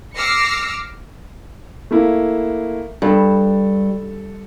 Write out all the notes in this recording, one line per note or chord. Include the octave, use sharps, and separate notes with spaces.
D6 E6 F6 A#6 C7 C#7
A3 A#3 E4
G2 A4